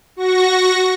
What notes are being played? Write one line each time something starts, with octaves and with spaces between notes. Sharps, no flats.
F#4 C#6 A#6